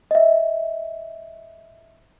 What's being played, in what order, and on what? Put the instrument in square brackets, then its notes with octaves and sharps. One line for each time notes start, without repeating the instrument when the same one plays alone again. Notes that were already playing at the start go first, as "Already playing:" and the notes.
[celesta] D#5 E5